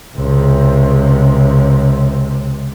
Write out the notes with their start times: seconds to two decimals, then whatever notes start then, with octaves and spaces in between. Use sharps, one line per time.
0.15 C#2 C3